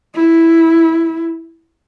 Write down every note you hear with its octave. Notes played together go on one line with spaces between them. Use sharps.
E4